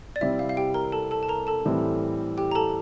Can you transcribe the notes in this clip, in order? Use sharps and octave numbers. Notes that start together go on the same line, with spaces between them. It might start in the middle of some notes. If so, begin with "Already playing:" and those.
D5
C3 G3 C4 E4 E5
F5
F5
G4 G5
A#4 A#5
A4 A5
A4 A5
A5
A#4 A#5
A4 A5
A2 E3 G3 C4
G4 G5
A#5
A4 A5